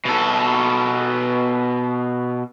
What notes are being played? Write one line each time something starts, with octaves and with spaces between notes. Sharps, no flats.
B2 A4